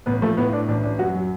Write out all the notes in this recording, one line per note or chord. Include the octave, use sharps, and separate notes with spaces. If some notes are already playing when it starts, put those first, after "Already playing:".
A1 B3
F3 A3
A2 B3
A2 D4
A1 D4
A1 D4
F#2 F#4
F#3